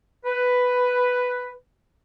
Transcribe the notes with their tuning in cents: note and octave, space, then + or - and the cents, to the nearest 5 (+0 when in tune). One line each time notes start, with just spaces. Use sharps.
B4 +5